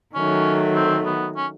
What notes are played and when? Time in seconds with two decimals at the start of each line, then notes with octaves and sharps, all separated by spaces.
0.15 D#3 F#3 A3 C#4
0.76 C4
1.06 B3
1.36 C#4